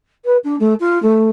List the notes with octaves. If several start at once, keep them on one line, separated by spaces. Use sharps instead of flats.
B4
D4
A3
F4
A3